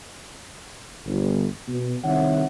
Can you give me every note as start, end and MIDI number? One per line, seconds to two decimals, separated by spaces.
1.06 1.44 31
1.68 1.95 47
2.03 2.44 36
2.03 2.44 51
2.03 2.44 60
2.03 2.44 73
2.03 2.44 76
2.03 2.44 78